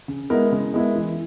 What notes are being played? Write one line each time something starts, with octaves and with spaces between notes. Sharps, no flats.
C#3
G#3 B3 E4 A#4
C#3
G#3 B3 E4 A#4
E3